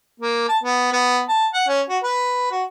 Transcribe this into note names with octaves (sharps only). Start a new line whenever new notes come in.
A#3
A5
B3
B3
A5
F#5
C#4
F#4
B4
F#4